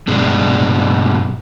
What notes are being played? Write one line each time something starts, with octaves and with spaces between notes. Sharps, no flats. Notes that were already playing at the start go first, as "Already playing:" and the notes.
G2 B2 G#3 D4